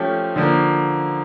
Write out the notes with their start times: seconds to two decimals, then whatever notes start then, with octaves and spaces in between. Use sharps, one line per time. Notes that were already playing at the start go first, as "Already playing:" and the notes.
Already playing: F3 A3 C#4 G4
0.36 D3 F3 A#3